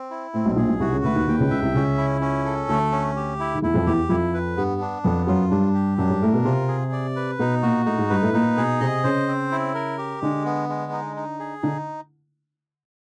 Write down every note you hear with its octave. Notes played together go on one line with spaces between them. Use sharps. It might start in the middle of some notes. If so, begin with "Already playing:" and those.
Already playing: C4
E4
A2 C4
B1 B2
A#1 A#2 G#4
B1 B2
C2 C3 F#4
C#2 C#3
D2 D3 B4
D#2 D#3
D#2 D#3 G5
C#2 C#3
C#2 C#3 E5
C2 C3
C#2 C#3 C#4
E4
C#4
A4
D2 D3 A3
C#4
G4
E4
D#3
E2 E3 E4
F2 F3
E2 E3 G4
F2 F3 E4
B4
G2 G3 B3
D4
F2 F3 B3
F#2 F#3 F4
G2 G3 D4
G4
F#2 F#3 D4
G2 G3
A2 A3 A#4
B2 B3
C3 C4 F4
G#4
D5
B4
B2 B3 D#4
A#2 A#3 F#4
A2 A3 D#4
G#2 G#3
G2 G3 B4
A2 A3
A#2 A#3 D#4
B2 B3 G#4
C3 C4 D#5
C#3 C#4 C5
C4
E4
A#4
G4
D3 G#3 D4
B3
G#3
D#4
D#4
G#4
D3 D4 D#4